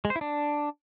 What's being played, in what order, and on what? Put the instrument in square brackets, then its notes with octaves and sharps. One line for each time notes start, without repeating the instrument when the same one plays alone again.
[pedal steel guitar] G#3
C5
E4
D4